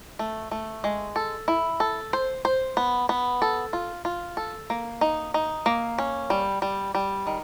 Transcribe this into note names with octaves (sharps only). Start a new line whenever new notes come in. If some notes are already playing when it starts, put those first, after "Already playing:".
A3
A3
G#3
A4
E4
A4
C5
C5
B3
B3
A4
F4
F4
A4
A#3
D#4
D#4
A#3
C#4
G3
G3
G3
D#3